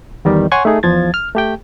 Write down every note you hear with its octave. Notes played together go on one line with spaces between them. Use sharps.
E2 D#3 G3
C#5 F#5 G#5 C6 C#6
A3 D#4 G#4
E2 F3 G#6 A6
F6
A3 G4 G5